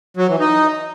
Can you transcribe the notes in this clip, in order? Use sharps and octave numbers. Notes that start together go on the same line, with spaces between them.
F#3
E3
D#4